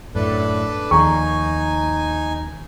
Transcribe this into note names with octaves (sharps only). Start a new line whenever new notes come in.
F#2 A2 D4 A4 B4
D#2 F3 D#4 G#5 A#5 C#6